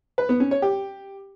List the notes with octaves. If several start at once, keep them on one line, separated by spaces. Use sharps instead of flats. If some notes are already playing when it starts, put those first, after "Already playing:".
B4
B3
C#4
C#5
G4